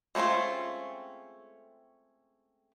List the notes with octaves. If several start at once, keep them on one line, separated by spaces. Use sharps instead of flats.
G#3 A3 C4 C#4 F4